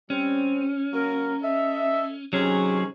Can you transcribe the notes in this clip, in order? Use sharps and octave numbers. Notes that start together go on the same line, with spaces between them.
G3 C4 C#4
F#3 A#3 A#4
A4 D#5 E5
C3 D#3 F#3 C#4 G#4